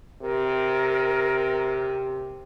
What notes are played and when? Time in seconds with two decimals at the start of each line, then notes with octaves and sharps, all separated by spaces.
0.22 C3 A#4